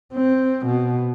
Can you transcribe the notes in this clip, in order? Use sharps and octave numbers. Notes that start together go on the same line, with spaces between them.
C4
B2